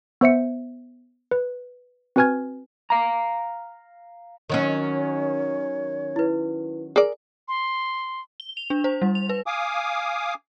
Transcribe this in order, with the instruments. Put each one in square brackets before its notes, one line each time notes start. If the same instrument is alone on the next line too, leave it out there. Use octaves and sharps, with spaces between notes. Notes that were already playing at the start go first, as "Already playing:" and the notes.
[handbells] B3 C5 E5 C#7
B4
C4 F#4 B4 G#5 F6 G#6
[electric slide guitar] F5 A#5
[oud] D#3 F#3 C#4 [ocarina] C#5
[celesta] E4 B4
[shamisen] G#4 A#4 D5
[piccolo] C6
[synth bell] G7
F7
D4
C5
G3
F7
B4
[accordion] F5 G#5 D6 D#6